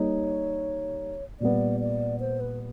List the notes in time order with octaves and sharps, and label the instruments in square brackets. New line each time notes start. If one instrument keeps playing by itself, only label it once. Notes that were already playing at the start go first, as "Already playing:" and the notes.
Already playing: [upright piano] G3 A#3 D#4 [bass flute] C#5
[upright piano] A#2 G3 B3 [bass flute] D5
[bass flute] D5
C5
B4